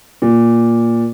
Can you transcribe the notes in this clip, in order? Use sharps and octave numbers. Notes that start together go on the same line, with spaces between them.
A#2